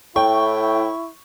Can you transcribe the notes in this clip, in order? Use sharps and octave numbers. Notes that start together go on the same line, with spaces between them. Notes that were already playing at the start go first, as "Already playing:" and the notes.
A2 E4 G5 C#6